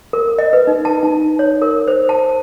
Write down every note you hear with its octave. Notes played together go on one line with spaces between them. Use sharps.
A#4
D#5
B4
D#4
A5
D#4
C#5
A#4
C5
A5